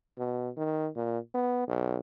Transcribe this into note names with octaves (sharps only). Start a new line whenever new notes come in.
B2
D#3
A#2
B3
B1